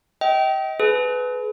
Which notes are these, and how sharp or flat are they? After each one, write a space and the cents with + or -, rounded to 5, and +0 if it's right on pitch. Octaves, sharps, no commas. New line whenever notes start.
D#5 +35 G5 -25
G#4 +45 B4 +15